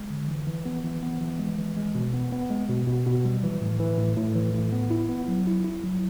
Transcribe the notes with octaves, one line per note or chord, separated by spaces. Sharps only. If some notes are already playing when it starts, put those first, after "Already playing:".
Already playing: G#3
D3
E3
E3
B3
E3
B3
E3
G#3
E3
G#3
B2
B3
B3
G#3
B2
B2
B2
G3
E3
A2
E3
A2
A2
E3
A2
B3
E4
B3
F#3
E4
E4
F#3